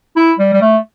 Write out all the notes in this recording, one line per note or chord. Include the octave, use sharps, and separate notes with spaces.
E4
G3
G3
A3